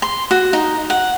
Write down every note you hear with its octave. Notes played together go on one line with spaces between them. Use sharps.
C6
F#4
D#4
F#5